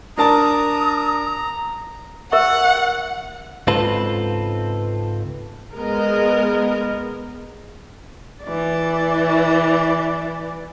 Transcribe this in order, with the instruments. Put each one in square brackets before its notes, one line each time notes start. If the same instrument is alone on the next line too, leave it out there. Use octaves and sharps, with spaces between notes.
[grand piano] D4 A#4 A5 [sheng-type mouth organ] A#5 [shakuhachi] D#6
[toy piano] A#4 E5 C#6 [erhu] F#5
[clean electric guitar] C#2 G#2 C4 F4 A4 B4
[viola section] G#3 B3 A#4 D#5
[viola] E3 D5